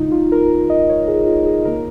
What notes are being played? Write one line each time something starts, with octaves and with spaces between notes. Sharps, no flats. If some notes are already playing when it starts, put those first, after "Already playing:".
Already playing: C#3 G#3 D#4 F4
F4
A#4
D#5
C#5
G#4
F4
G#4
C#3 A#3 A#4